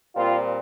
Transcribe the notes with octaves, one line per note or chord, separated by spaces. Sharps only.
A#2 G3 C4 F4